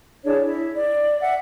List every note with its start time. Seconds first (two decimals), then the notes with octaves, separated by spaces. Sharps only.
0.25 D4 E4 G#4 C#5
0.43 E4
0.74 D5
1.20 E5 F#5